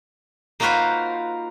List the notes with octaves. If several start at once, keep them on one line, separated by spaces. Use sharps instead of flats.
A#3 D#4 F4 F#4 B4 C5